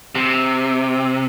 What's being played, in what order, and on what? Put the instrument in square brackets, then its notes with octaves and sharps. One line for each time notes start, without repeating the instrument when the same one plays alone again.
[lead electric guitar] C3